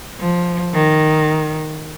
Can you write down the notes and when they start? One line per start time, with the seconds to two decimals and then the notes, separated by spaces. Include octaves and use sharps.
0.19 F3
0.74 D#3